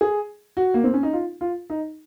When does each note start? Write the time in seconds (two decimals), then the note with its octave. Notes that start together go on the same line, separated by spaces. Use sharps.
0.01 G#4
0.57 F#4
0.74 A#3
0.84 C4
0.94 C#4
1.03 D#4
1.13 F4
1.41 F4
1.70 D#4